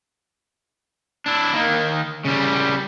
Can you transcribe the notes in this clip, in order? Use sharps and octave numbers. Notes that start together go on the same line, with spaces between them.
D4 E4
D#3 A#3
C#3 G3